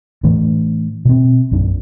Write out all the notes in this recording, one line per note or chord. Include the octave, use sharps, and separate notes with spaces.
A2 E3 A3 D4
B2 C4
A#1 F#2 F#3 D4